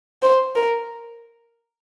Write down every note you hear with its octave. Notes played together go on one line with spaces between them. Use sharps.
C5
A#4